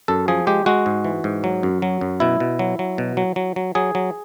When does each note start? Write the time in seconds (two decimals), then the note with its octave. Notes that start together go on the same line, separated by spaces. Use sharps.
0.08 F#2 A4
0.28 F3 G#4
0.47 G#3 G4
0.66 G#3 F#4
0.86 G#2
1.04 E3
1.24 G#2
1.44 F#3
1.63 F#2
1.82 F#3
2.01 F#2
2.20 B2 E4
2.40 B2
2.59 F#3
2.79 F#3
2.98 B2
3.17 F#3
3.36 F#3
3.56 F#3
3.75 F#3 G#4
3.95 F#3